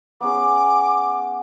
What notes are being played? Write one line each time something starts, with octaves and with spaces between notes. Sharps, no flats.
B3 C#4 G#4 D6